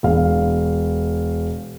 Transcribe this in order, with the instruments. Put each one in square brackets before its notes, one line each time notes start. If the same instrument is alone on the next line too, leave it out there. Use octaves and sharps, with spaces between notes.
[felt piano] E1 F5